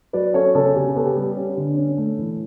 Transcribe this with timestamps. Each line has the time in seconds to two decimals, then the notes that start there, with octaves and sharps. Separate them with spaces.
0.13 F#3 B4 D5
0.34 C#4 A4 C#5
0.55 C#3 A4 C#5
0.75 C#3 G4
0.95 B3 A4
1.06 G4
1.16 G3
1.36 C#4
1.57 D3
1.77 C#4
1.97 A3
2.19 E3